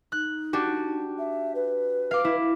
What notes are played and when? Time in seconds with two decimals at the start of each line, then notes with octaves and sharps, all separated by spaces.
0.12 D#4 F#6
0.53 D4 F#4 G4
1.18 E5
1.55 B4
2.11 F5 D6
2.24 E4